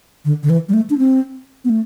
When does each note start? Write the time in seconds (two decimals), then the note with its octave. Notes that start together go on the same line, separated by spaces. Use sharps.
0.25 D3
0.43 D3
0.50 E3
0.69 G3
0.74 A3
0.90 D4
0.98 C4
1.65 B3
1.70 A3